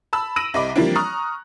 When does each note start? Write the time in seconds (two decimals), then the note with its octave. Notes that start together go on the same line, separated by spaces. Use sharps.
0.13 A5 B5 E6
0.36 E6 A#6 D7 D#7 F#7
0.54 C2 C3 D#5 B5 D6
0.76 E3 F3 G3 A#3 C4 D4
0.95 A#5 C#6 D#6 F6 F#6